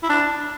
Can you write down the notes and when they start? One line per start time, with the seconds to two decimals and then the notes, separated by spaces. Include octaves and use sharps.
0.03 E4
0.09 D4